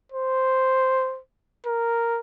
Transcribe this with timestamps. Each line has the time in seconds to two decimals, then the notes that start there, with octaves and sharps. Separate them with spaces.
0.12 C5
1.66 A#4